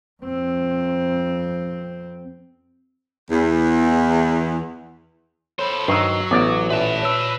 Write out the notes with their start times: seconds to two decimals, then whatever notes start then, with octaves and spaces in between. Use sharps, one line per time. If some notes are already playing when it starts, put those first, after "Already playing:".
0.23 F2 C4
3.30 E2
5.59 A4 C5 C#5 B5
5.88 G2 D#3 F#3 C5 E6 C7
6.31 A1 B3 D5 D6
6.70 A#2 B4 E5 A5
7.02 C#5 E6